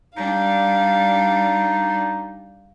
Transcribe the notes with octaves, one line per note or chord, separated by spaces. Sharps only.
G3 D4 D#4 F5